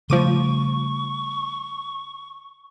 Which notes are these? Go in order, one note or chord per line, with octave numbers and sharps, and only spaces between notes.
C#3 F3 G3 A3 C#6 D6 D#7